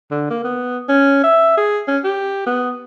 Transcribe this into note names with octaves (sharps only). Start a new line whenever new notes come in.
D3
A#3
B3
C#4
E5
G#4
C#4
G4
B3